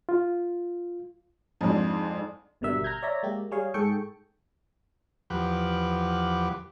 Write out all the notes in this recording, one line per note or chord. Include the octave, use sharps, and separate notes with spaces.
F4
F2 G#2 G#3 D4
G#1 B2 D3 G3 A#4 E5
A#5 F6 G6 G#6
C#5 D5 E5 A#5
G#3 A#3 G4
G3 G#4 C#5 F5
G#2 G#4 A4 G5 C#6 C#7
E2 F3 G4 B4 F#5 D6